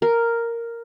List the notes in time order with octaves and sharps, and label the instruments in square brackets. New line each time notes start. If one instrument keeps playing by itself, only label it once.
[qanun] A#4